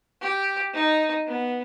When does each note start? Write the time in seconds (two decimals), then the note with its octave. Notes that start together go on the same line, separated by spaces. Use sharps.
0.21 G4
0.74 D#4
1.26 B3